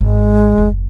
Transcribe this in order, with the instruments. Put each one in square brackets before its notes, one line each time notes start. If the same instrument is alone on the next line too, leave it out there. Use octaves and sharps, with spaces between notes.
[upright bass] G#1 [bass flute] G#3
[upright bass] F#1 D#2